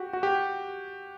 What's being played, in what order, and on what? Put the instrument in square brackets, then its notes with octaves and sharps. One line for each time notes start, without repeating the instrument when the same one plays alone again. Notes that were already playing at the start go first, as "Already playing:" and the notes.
Already playing: [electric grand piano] F#4 G4
F#4
G4